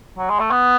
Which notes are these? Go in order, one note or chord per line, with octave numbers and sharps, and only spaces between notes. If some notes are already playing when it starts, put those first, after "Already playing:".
F#3
G#3
A3
B3